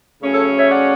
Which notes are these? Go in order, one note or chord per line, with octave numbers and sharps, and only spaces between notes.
C#3 F#3 A3 C#4
A4 C#5
C#5 E5
D5 F#5